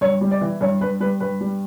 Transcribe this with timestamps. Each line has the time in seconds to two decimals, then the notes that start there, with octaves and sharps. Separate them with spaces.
0.01 G2 C#5
0.21 G3
0.31 D5
0.41 E3
0.61 G2 C#5
0.81 G2 B4
1.00 G3 B4
1.20 G2 B4
1.41 G3